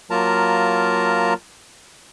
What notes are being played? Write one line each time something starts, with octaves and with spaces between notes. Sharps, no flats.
F#3 A#3 F4 A#4 A5 A#5